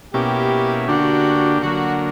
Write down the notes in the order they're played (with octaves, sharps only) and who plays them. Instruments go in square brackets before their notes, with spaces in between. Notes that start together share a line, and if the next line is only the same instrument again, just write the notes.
[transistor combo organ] B2 A#3 C#4 E4 [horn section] G4
[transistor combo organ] D3 A#3 D4 G4 [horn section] F#4
[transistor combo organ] D3 F#3 A#3 [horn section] F#4